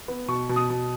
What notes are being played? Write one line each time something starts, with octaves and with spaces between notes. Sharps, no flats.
B3
B2 C#6
B2
D#6
B2